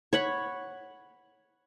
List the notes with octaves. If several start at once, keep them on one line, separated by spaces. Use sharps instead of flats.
C#5 F#5 B5